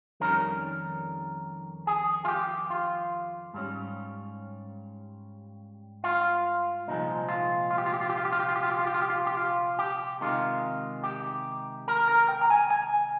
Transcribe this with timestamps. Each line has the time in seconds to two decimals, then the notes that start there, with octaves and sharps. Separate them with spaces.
0.20 F2 D#3 G3 C#4 A#4
1.87 G#4
2.25 F4
2.28 G4
2.70 F4
3.54 G#2 G3 C#4
6.04 F4
6.87 C2 A#2 F3 G#3 D#4
7.29 F4
7.71 F4
7.78 G4
7.86 F4
7.94 G4
8.01 F4
8.10 G4
8.17 F4
8.25 G4
8.33 F4
8.40 G4
8.49 F4
8.56 G4
8.63 F4
8.71 G4
8.79 F4
8.87 G4
8.94 F4
9.02 G4
9.10 F4
9.27 G4
9.37 F4
9.79 G4
10.21 C3 D#3 G#3 F4
11.04 G4
11.88 A#4
12.08 A#4
12.29 G5
12.41 A#5
12.50 G#5
12.70 G#5